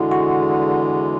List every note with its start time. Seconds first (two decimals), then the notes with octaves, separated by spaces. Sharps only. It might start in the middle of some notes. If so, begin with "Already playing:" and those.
Already playing: E2 D3 G#3 E4 F#4
0.11 F#4